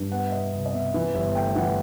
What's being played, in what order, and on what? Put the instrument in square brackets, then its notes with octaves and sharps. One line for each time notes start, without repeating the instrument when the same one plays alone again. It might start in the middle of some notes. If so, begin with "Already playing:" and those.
Already playing: [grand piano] G2
B3 F#5
E5
B2 D#5
C2
D#5
B2 E5
E3
G1 E5
A3 G5
E3 F#5